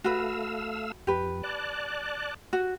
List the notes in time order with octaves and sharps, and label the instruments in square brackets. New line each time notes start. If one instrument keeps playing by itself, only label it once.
[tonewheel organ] A3 F5 E6 [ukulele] F#4 B4
[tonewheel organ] F2 [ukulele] G4 B4
[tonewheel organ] D5 A5 F#6
[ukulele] F#4